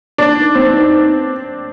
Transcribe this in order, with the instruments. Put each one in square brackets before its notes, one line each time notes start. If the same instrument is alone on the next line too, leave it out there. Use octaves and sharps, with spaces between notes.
[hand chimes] B3 [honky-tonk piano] D4
[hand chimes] D#4 B4
[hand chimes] B3 [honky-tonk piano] C4
[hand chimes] D#4 B4
B3